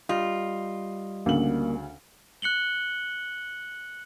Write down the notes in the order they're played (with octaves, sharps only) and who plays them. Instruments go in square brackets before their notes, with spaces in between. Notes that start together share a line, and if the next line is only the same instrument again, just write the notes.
[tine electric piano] G3 D#5 [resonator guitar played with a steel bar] F4
[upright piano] D2 C#3 F#7 [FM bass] A#3
[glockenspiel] F#6 C#7 F#7 G7